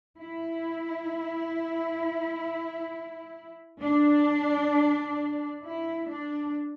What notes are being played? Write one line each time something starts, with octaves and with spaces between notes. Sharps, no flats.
E4
D4
E4
D4